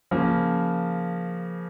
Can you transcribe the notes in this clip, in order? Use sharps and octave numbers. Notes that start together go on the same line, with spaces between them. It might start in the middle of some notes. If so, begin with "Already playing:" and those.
C#3 F3 A#3